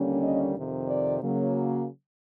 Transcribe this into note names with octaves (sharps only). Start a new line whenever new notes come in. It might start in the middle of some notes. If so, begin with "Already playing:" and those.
Already playing: D#2 D3 G3 A#3 C#4
D#5
F2 C3 D#3
D5
C#3 F#3 A#3